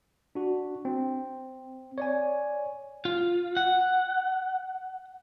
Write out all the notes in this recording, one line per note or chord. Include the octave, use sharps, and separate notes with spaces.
D4 F#4
C4
C#5 D5 G#5
F4
F#5